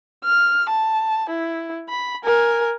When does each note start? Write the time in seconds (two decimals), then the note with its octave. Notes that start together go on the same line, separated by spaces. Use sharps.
0.24 F6
0.69 A5
1.30 E4
1.89 B5
2.24 A#4 G#5